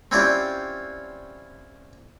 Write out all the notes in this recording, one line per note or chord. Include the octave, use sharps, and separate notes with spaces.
C4 C#4 E4 F4 G4 D5